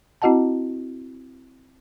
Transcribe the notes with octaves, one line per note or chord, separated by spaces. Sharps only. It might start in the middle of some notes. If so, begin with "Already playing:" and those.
C4 E4 F#4 D#5 F#5 A5